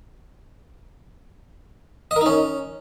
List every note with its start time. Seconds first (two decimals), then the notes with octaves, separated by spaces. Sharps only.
2.11 D#5
2.16 A#4
2.21 D#4
2.26 C#4